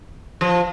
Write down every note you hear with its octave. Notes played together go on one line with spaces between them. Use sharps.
F3